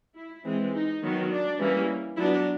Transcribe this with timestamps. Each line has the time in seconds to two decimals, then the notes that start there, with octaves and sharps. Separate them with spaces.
0.15 E4
0.44 E3 G#3 C4
0.73 D#4
1.02 D#3 F#3 B3
1.31 D4
1.58 E3 G3 A#3 C#4
2.16 F#3 B3 D4 E4